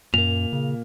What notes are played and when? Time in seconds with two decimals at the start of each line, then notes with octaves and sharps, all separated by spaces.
0.14 F#2 A#2 A#3 F7
0.53 C#3